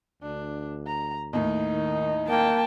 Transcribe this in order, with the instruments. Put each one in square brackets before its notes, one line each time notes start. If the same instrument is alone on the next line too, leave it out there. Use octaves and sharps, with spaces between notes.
[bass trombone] D2 [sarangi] D4
[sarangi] A#5
[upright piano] D#2 A2 [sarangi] D#4
[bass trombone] D#3
[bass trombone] A#3 [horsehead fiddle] G5 A5